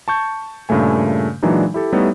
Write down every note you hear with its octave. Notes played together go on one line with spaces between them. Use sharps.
A5 C#6 G6
G2 A#2 C#3 A3 G#5
A#2 E3 F#3 G#3 D4 D#4
E4 G4 A4
G3 A3 B3 D#4 E4 C#5